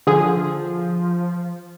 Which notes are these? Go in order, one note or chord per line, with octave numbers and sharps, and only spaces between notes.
D3 F3 G#4